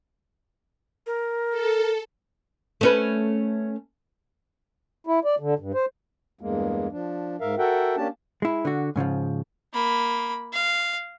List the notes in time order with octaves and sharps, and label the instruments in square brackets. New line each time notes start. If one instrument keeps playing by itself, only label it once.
[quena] A#4
[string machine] A4
[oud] A3 C#4 B4
[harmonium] E4
D5
D3
G2
C5
E2 G2 G#3 A#3
F3 D4
G#2 A#4 E5 F5
F#4 A4 A#4 E5 F#5 G5
A#3 C#4 D4 G4 A5
[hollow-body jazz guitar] G#3 E4
D3 F#4
G#2 C#3 E3 F3
[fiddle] A#3 B5
F5